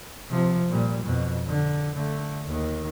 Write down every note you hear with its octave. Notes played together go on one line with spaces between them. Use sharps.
C3 F3
A#2 G3
F2 B2
D3
D3 A3
D#2 D#3